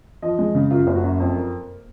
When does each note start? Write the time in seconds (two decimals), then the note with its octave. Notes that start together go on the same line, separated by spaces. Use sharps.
0.22 F3 D#5
0.39 G#3
0.55 C#3
0.71 F#2 F4
0.87 F#1
0.95 F#4
1.04 F#2
1.20 F2
1.36 A#3